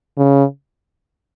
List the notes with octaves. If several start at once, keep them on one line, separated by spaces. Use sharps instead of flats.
C#3